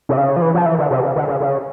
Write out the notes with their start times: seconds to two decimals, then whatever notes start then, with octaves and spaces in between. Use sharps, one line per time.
0.09 C3
0.17 C#3
0.36 F3
0.42 E3
0.54 F3
0.66 E3
0.78 D3
0.91 C3
1.03 C#3
1.16 D3
1.28 C#3
1.40 C#3